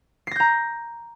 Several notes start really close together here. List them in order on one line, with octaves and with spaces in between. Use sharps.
C7 A#6 G6 A#5